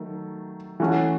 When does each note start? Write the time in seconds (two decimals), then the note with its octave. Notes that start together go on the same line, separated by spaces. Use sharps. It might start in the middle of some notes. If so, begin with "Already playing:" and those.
Already playing: D#3 F#3 A3
0.80 E3 A3 C#4 F#4